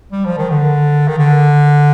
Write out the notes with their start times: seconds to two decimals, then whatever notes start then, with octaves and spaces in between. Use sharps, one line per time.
0.12 G3
0.25 F3
0.37 D#3
0.50 D3
1.08 D#3
1.18 D3